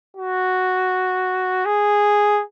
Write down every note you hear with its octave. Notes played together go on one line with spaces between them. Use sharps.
F#4
G#4